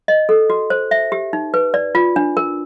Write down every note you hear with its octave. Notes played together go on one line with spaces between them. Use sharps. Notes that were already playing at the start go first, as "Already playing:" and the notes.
D#5
A4
F#4
C5
E5
G4
D#4
B4
D5
F4
D4
A#4